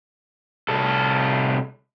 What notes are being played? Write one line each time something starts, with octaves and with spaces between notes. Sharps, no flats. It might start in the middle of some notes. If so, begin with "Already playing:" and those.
C2 A4